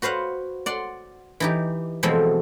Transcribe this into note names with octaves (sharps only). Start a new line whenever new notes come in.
F#4 B4 C5 F5 F#5
D5 F#5 C6
E3 D#4 G4
B2 E3 F3 G#3 A3 C4